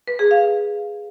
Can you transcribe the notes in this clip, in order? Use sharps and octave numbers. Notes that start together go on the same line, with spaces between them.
B4
G#4
F5